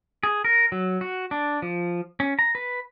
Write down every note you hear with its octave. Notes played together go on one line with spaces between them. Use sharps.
G#4
A#4
F#3
F#4
D4
F3
C#4
A#5
B4